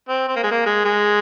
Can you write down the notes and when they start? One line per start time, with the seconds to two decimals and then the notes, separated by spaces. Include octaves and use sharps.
0.09 C4
0.28 C4
0.36 A#3
0.43 G#3
0.51 A#3
0.66 G#3
0.85 G#3